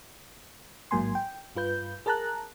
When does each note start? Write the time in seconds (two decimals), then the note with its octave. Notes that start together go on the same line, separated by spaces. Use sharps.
0.91 A1 G#2 F#3 A#3 G#5 C6
1.15 G5
1.55 G2 F4 B4 G6
2.06 G#4 A#4 A5 A#5 F#6